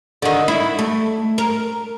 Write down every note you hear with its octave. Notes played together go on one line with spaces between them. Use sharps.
D3 D#3
E4
A3
A#4